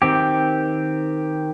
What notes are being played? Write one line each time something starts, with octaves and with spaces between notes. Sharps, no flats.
D#3 C4 G4